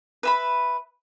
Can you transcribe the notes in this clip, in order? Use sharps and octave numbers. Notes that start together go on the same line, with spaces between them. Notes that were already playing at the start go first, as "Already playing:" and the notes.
B4 E5 B5